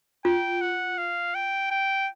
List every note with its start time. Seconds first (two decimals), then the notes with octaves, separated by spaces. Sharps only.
0.25 F4 G5
0.61 F#5
0.98 F5
1.35 G5
1.71 G5